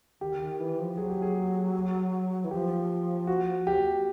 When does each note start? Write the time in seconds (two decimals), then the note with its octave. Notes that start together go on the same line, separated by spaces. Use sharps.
0.20 D#3 G4
0.34 D3
0.40 D#3
0.59 E3
0.78 F3
0.97 F#3 G#4
1.10 G4
1.22 G#4
2.44 E3
2.51 F3 G4
3.27 F#4
3.67 G4